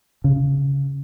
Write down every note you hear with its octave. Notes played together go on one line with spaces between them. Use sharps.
C#3